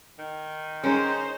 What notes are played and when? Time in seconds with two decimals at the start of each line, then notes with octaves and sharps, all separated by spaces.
0.19 D#3
0.84 G#3 C#4 D#4 A#4 C5